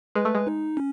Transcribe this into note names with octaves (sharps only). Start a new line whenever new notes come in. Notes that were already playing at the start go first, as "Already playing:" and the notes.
G#3 B4
A3
G#3
D#4
C#4